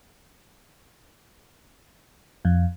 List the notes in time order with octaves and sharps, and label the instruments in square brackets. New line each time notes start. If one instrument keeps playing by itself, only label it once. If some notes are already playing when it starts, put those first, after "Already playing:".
[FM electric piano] F2